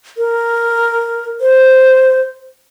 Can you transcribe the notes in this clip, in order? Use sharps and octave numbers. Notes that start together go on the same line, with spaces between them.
A#4
C5